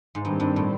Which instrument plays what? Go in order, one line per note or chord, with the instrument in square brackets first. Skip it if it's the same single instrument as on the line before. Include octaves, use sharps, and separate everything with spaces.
[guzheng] G#2
[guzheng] G2 [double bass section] D#3 G3 C4
[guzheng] G2
A2